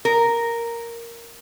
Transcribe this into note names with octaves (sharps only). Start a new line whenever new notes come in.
A#4